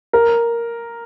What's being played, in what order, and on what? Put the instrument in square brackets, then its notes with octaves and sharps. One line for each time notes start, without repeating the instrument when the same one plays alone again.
[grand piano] A#4